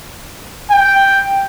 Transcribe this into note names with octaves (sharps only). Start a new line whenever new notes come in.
G5